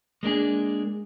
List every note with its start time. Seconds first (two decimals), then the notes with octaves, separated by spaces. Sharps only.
0.23 G#3 A#3 D4 G#4